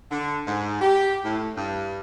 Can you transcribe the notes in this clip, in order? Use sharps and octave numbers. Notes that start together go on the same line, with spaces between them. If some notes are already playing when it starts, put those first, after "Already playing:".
D3
G#2
G4
A2
G2